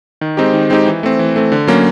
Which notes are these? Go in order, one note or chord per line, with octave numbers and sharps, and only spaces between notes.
D#3
G#3 C4 D#4 G4
D#3
G#3 C4 D#4 G4
E3
A3 C4
E3
A3 C4
D3
F#3 A#3 C#4